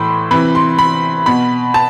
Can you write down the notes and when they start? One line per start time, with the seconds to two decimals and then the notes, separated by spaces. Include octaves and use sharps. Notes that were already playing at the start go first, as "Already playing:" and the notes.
Already playing: A2 E3 B5 C6
0.31 C3 E3 B5
0.55 C6
0.78 B5
1.26 B2 B5
1.74 A5